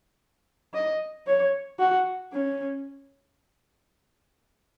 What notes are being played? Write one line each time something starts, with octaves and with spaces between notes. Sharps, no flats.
D#5
C#5
F#4
C#4